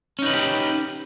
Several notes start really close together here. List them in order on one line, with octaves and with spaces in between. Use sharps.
C#4 D#4 B4 F4 G4